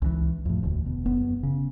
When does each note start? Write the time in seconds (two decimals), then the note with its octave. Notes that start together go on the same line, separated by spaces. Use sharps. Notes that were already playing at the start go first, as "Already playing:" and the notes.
0.02 C#2 D#3 E3
0.45 F2 A2
0.63 E1 D2
0.86 B2
1.06 F#1 B3
1.43 C#3